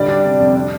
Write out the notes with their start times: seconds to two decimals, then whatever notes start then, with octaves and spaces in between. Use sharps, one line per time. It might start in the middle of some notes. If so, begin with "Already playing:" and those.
Already playing: D3 G3 D5
0.09 D4
0.24 C3
0.40 F2
0.55 D4